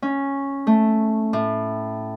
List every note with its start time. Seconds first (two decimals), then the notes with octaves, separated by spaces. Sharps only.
0.02 C#4
0.67 A3
1.33 A2